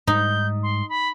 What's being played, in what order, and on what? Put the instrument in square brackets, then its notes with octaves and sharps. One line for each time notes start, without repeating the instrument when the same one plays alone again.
[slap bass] G#2 G3 [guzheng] D#4 [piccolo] G6
[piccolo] C6
B5